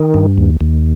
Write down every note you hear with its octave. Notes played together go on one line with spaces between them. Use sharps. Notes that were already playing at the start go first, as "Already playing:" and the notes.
Already playing: D#3
G2
D#2
D#2